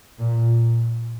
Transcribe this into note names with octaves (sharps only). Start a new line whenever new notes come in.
A#2